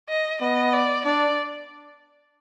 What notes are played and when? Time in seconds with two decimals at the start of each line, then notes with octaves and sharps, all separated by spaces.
0.09 D#5
0.41 B3 D#5
0.73 D5
1.05 D4 D5